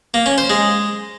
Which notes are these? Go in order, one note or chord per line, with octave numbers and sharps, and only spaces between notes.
A#3
C#4
C5
G#3